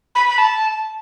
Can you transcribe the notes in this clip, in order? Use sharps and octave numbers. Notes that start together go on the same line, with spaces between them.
B5
B5
A5